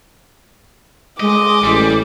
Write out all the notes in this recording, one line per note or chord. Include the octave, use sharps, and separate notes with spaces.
G#3 D#5 D6
A1 G3